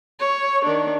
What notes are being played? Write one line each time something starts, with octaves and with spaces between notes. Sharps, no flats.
C#5
D#3 D4